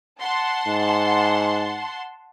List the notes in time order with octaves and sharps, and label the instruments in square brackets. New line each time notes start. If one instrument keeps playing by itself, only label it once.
[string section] F#5 A5 C6
[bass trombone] G#2